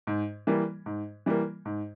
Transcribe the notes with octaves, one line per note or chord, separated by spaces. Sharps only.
G#2
E3 G3 A#3
G#2
E3 G3 A#3
G#2